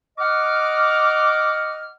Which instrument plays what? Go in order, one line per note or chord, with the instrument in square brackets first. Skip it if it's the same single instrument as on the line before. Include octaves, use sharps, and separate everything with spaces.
[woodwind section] D#5 F#5 D6 F6